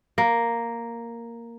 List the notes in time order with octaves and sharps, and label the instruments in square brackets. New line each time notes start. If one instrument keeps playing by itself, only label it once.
[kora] A#3